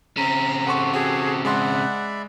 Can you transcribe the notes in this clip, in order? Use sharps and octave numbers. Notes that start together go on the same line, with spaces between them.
C#3 C4 A#5
G4 A4 F#5 C6 C#6
F#4 G#4
G#3 D5 E5 F#5 B5 C6